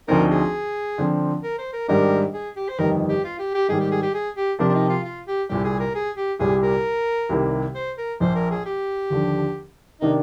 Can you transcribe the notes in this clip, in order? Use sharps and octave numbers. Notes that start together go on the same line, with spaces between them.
D2 D3 F3 C4 D#4 A#4
G#4
D3 F3 C4
A#4
C5
A#4
G#2 D#3 G3 D4 A#4
G#4
G4
C5
G1 F2 D#3 G3 A#4
G4
F4
G4
G4
G#2 D#3 G3 G#4
G4
G#4
G4
G#4
G4
C3 F3 C4 D4 G4 A#4
D4
D#4
F4
F4
G4
C2 A#2 G3 G4
G#4
A#4
G#4
G4
C2 A#2 G3 G#4
A#4
C2 C3 D#3 G3 A#3
C5
A#4
A#1 A#2 F3 C5
A#4
G#4
G4
D#2 D3 F3
C3 D#3 A#3 D4 D#4